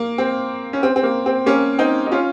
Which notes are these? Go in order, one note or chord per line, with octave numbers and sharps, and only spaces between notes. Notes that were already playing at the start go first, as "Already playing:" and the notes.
Already playing: A#3
C4
C#4
C4
C4
A#3
C4
A#3 C#4
C4 D#4
D#4
C#4 F4